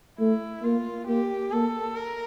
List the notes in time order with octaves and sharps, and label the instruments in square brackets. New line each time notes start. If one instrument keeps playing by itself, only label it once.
[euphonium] A3 [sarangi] E4
[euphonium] A#3 [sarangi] F4
[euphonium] A#3 [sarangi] G4
[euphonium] A#3 [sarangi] A4
[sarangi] A#4